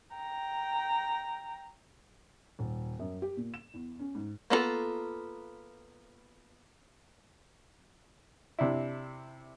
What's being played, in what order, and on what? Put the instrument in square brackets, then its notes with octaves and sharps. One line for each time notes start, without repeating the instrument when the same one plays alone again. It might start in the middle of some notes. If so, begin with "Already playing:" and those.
[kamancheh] G5 A#5
[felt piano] D#1
F#2
G4
A#2
E7
E2
C#4
G#2
[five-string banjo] A#3 B3 D4 F4 A4
[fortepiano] C3 D4 E4